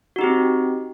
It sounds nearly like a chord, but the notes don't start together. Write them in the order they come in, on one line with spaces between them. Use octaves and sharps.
F#4 D#4 G4 C4